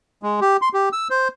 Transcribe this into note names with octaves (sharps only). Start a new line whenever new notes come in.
G#3
G4
C6
G4
E6
C5